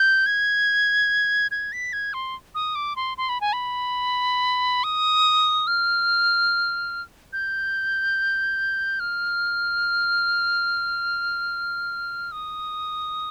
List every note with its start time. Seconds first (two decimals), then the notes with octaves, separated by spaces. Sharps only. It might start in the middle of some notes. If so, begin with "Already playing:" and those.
Already playing: G6
0.26 G#6
1.51 G#6
1.72 B6
1.93 G#6
2.14 C6
2.55 D#6
2.75 D6
2.96 C6
3.18 C6
3.29 B5
3.41 G#5
3.53 B5
4.84 D#6
5.67 F6
7.33 G6
9.00 F6
12.32 D#6